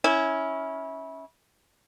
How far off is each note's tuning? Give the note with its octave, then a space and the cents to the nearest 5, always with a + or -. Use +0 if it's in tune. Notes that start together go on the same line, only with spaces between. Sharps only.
C#4 +0 E4 -20